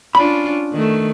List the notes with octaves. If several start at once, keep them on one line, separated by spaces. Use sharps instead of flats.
C#4 D4 F4 B5
D#3 A3